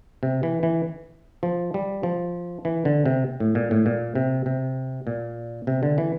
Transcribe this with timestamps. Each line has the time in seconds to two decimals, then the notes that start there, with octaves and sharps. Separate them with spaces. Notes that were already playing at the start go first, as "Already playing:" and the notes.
0.23 C3
0.43 E3
0.63 E3
1.43 F3
1.74 G3
2.03 F3
2.65 E3
2.85 D3
3.06 C3
3.40 A2
3.55 A#2
3.71 A2
3.86 A#2
4.15 C3
4.46 C3
5.07 A#2
5.67 C3
5.83 D3
5.98 E3